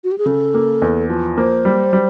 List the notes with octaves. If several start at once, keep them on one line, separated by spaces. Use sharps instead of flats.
F#4
G4
G#4
C#3 A4
A#3
E2
F3
A#3 C5
G3
G3